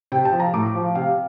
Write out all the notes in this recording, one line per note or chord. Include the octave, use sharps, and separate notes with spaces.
C3 G5
A5
F3
A#5
A2 D6
F3
C3 F5